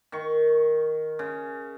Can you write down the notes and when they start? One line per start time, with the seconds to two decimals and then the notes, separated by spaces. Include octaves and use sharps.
0.12 D#3 C#6
1.19 C#3